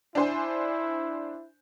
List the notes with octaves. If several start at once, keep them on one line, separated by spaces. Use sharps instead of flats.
D4 E4 C5 G#5